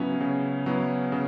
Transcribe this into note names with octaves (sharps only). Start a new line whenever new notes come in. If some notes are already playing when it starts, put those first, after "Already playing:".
Already playing: C#3 F#3 B3 C#4 E4
C#3
F#3 B3 E4
C#3